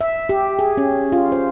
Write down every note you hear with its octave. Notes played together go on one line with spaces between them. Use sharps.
E5
G4
G#4
C#4
F4
C5